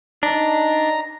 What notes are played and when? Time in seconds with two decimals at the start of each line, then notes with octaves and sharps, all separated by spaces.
0.23 D4 D#4 A#5